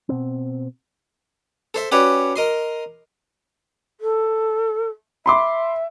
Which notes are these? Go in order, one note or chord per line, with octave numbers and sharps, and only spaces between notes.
B2 C4
A4 C5 E5
C#4 F#4 G4 B4 C#5 D5
A#4 D#5 C6
A4
E5 B5 C6 D6